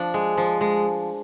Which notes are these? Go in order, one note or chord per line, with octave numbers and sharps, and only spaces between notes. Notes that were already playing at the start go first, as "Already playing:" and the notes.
Already playing: F3 D4
G#3
F3
G#3